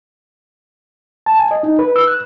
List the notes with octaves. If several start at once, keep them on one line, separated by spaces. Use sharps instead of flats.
A5
G#5
D#5
D#4
B4
E6
F#6